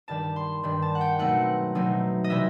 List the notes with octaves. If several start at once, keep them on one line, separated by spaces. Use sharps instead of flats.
G2 D#3 G3 A5
C6
G2 D#3 G3
A5
F#5
G5
B2 F#3 A3 C4 D#4 F#5
B2 F#3 A3 C4 D#4
D#5
C3 E3 G3 D#4 E5